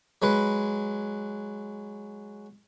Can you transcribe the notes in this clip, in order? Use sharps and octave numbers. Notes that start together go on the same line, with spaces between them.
F#3 G#3 B4